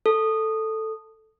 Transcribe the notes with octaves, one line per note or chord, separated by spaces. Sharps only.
A4